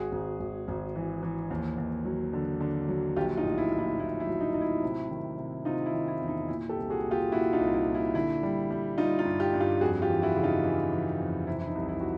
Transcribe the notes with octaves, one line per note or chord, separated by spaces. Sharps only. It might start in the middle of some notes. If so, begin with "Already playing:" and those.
Already playing: G#1 F#4 G#4
G#1
G#1
G#1
E3
E3
D#2
D#2
F#3
D3
D3
F#3
A#1 F4 G4
D#4 F4
A2
E4
A#1
E4
A#1 E4
E4
F#3
D#4
A2 D#4
E4
C3
D#3
C3
C3 D#4 F4
E4
D#3
E4
E2
D#4
A#2 E4
G4 A4
C2
F#4 G#4
A#2
F4 G4
A#2 E4 F#4
D#4 F4
C2
E4
A#2
E4
D3 E4
G3
G3
G3 D#4 F4
D#4 F4
G2
F4 G4
G2
F4 G4
F2 F#4 G#4
F4 G4
E3
E4 F#4
C#3
D#4 F4
E3
E3
F2
C3 E4
E4
D#4
C2
E4
F#4